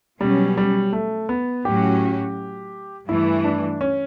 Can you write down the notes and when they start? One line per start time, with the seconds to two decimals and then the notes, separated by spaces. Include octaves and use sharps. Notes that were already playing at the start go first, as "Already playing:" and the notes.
0.21 B2 F#3 G3 C#4
0.57 G3
0.93 A3
1.29 B3
1.65 A2 F#3 C#4 F#4 G4
3.08 G2 E3 A3 E4
3.44 D4
3.81 C#4